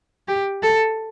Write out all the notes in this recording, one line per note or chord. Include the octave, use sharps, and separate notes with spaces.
G4
A4